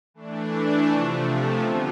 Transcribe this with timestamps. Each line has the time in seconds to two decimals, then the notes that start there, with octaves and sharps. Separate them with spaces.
0.14 E3 A3 D4
0.88 C3 F3 A3
1.61 D3 G3 B3 F4